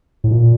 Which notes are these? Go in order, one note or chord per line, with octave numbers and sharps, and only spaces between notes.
A2
A#2